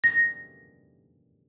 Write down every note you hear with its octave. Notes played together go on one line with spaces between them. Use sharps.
A#6